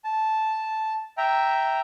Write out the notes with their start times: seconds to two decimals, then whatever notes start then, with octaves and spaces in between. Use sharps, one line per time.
0.04 A5
1.17 E5 G5 A#5